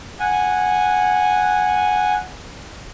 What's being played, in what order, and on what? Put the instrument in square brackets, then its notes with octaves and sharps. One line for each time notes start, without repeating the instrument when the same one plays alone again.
[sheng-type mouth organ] F#5 G#5